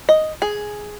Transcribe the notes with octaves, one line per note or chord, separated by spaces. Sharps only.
D#5
G#4